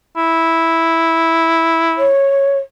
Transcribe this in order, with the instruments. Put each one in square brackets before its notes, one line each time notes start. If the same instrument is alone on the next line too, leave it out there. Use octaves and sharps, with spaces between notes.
[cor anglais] E4
[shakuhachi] C#5